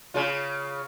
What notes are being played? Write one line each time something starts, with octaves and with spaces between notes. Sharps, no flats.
C#3 F4